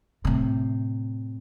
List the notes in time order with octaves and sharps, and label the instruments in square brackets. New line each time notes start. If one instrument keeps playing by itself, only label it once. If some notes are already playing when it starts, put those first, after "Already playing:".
[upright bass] A2 C3